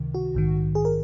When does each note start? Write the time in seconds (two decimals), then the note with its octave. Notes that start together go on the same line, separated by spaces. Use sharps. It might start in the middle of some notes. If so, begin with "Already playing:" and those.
Already playing: C#2 C3 D#3
0.15 F#4
0.34 A#1 G#2 D#3
0.75 G#4
0.85 A#4